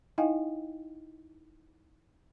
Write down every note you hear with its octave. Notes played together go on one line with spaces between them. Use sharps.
D#4 E4 D#5 F5 G5 G#5